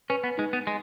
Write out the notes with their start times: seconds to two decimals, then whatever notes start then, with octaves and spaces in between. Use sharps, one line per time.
0.10 C#4 B4
0.24 B3
0.38 G#3 D#4
0.53 B3
0.67 G#3